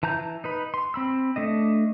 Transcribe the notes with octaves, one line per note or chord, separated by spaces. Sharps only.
E3 A5 A#5 G6
D#4 B4 B5
C6
C4 B5 E6
A3 D4 D#5